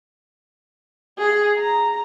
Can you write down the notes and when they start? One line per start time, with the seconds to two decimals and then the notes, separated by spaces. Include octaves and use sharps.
1.19 G#4
1.58 A#5